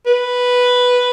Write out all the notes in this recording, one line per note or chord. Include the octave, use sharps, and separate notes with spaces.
B4